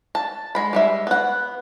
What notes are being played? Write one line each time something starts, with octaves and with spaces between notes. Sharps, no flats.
A5
G#3 B5
G3 G#3 E5
B3 F#5